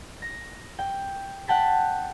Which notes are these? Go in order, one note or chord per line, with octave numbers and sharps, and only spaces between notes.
A#6
G5
F#5 G5 A5 B6